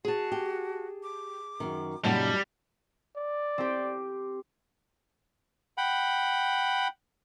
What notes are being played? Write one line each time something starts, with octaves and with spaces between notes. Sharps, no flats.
F#4 G#4 A5
G4
D6
F#2 D#3
F#2 A#2 C#3 G3 D#4 A5
D5
C4 G4
F#5 G5 B5